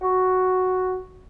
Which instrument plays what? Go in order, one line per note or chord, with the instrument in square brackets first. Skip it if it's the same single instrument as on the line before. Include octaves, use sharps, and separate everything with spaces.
[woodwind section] F#4